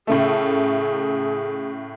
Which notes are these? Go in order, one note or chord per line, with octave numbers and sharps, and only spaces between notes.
A2 C#3 A3 G#4